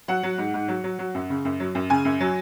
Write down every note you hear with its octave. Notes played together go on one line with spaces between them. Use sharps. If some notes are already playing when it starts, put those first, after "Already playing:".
F#3 F#5
F#3
G#2
G#2
F#3
F#3
F#3
F#2
C#3
F#2
F#3
F#2
C#3 G#5
F#2
F#3